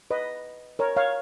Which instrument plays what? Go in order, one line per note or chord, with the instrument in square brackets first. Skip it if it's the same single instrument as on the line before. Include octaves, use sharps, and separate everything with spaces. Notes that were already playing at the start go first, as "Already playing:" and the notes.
[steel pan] B4 D#5
A#4 C#5
C#5 F5